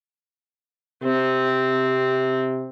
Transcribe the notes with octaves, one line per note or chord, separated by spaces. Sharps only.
C3 C4